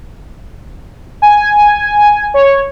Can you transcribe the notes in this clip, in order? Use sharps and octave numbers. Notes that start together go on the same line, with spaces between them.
G#5
C#5